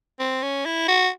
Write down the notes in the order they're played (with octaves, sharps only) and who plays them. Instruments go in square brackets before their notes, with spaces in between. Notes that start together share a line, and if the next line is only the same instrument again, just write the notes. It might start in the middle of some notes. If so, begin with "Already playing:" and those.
[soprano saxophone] C4
C#4
E4
F#4